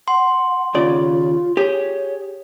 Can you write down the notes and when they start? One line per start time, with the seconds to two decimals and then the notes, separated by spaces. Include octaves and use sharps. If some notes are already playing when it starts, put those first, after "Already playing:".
0.08 F#5 C6
0.75 D#2 C#3 F4 D5
1.57 G4 G#4 C#5